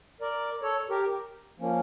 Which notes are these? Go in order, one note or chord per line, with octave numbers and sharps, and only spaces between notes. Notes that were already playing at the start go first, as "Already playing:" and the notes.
A#4 D5
A4 C#5
G4 A#4
F3 A#3 C#4